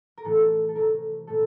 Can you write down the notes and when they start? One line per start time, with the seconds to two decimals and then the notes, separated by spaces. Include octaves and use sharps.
0.17 A#4
0.24 A2 E3 A3 A4
0.69 A4
0.75 C3 E3 A3 A#4
1.27 A#2 A3 A4